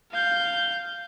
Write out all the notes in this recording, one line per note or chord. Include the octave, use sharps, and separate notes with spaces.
F5 G6